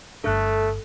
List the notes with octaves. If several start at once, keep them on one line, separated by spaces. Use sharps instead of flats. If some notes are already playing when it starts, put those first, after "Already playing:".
G1 A3 D4 A4 F#6